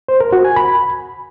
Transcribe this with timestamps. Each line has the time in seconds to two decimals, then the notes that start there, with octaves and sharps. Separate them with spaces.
0.08 C5
0.20 A#4
0.32 F#4
0.44 G#5
0.56 B5